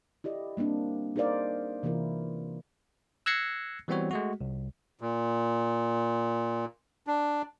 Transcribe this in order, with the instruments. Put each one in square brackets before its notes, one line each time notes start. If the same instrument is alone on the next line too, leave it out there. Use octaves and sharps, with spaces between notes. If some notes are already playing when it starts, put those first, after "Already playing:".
[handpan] E4 G4 D5 D#5
G3 A#3 C4 D4
D#4 G#4 A#4 C5 D5 F5
C3 E3 A#3 E4 F4 A#4
[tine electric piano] E6 F#6 G#6 A#6 C7 C#7
E3 G3 B3 C4 F#4 C#5
G#3 A3 F#4
C2
[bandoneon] A#2
D4